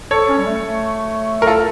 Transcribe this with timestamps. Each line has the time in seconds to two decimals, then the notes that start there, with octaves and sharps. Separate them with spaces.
0.11 A4 C#5
0.28 C#4
0.37 G3
0.45 A3
0.63 A3
1.42 A#4
1.47 F4 A4